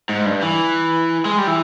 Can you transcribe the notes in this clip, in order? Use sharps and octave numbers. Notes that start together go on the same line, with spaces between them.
G#2
G2
E3
G#3
G3
E3